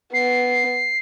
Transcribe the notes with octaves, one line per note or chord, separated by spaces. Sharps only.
B3 C7